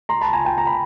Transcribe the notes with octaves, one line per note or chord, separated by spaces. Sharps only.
A#5 C6
A5 B5
G#5 A#5
G5 A5
A#5
B5